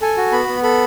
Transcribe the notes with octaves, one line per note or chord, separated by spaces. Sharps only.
A4 G#5
F#4
B3 B5
B3
A4 B5